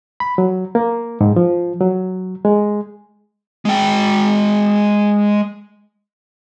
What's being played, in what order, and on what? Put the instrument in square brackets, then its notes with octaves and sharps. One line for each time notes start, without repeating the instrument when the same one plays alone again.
[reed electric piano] B5
F#3
A#3
G#2
F3
F#3
G#3
[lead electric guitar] G#3 G5